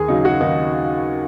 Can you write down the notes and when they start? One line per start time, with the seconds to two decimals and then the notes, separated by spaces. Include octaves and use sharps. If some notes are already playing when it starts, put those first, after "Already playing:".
Already playing: D#2 G#4
0.08 C#3 F#3 D#4
0.25 F#4
0.40 D#2 D#4